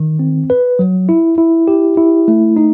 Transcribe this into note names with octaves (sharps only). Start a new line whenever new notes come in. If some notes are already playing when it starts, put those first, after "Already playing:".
Already playing: D#3
C4
B4
F#3
E4
E4
G4
E4
A3
D#4